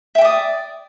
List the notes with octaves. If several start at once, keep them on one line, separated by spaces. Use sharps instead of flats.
D5 E5 G5 D#6